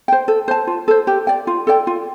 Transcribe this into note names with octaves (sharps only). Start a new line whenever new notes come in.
C5 G5
A4
C5 A5
F4
A4 C5
G4
D5 G5
F4
A4 D5 G5
F4